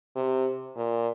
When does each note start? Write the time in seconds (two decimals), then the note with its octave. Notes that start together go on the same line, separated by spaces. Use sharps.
0.16 C3
0.76 A#2